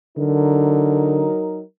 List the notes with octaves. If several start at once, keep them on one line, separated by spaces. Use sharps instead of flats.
D3 F#3 D#4 A#4